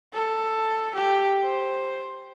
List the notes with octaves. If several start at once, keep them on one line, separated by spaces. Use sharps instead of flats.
A4
G4
C5